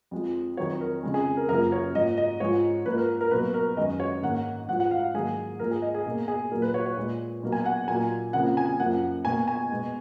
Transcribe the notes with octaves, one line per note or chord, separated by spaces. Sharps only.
F2 F3 G#3
F2 D#3 F#3 C#5
A#4
F2 C#3 G#3
G#4
A#4
F#2 C#3 F3 A#3 A#4
C#5
G#2 F3 A#3 D#5
D#5
G#2 F3 G#3 C#5
G#2 F3 A#3 B4
A#4
A#4
B2 F#3 A#3 B4
A#4
F#2 D#3 G#3 D#5
C#5
G#2 D#3 A#3 F#5
G#2 F3 G#3 F#5
F#5
F5
G#2 D#3 F#3 A#3 G#4
G#2 F3 A#3 A#4
G#4
D#5
G#4
B2 A#3
G#4
A#2 F#3 A#3 A#4
B4
C#5
C#5
A#2 G#3
B2 F#3 A#3
G#5
F#5
A#2 F#3 A#3 G#5
F2 C#3 F3 A#3 F#5
G#5
F#2 F3 A#3 F#5
B2 A#3 G#5
G#5
B2 G#3